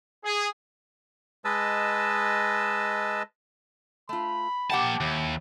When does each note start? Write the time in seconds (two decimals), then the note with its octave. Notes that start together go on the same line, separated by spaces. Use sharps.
0.25 G#4
1.45 G#3 B4 D#5 A5 E6
4.09 A3 F4 B5
4.70 A#3 G4 F#5 G5 A5
5.01 D#2 E4